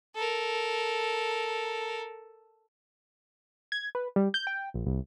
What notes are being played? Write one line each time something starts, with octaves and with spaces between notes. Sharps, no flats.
A4 A#4
G#6
B4
G3
G6
G5
A#1
C2